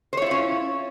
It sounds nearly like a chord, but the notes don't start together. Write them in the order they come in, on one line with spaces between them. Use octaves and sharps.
C5 C#5 E4 F4 C#4